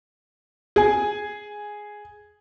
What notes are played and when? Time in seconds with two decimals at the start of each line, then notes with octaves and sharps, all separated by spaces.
0.76 G#4 G#5